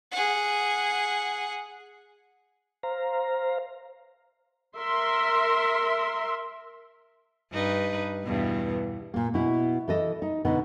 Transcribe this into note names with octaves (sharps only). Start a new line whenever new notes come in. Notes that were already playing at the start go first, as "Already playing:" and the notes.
G#4 F#5
C5 F5 A#5
A#4 E5 C6
G2 D#4 B4
E2 G2 B2
A#2 A#3
B2 E4
E3 A4 D#5
D#4
B2 D3 B3 D#4